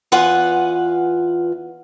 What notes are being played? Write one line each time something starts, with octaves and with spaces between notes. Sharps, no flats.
E2 F4 B4 F#5 G#5